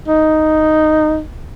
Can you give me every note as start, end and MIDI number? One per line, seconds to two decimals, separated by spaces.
0.08 1.20 63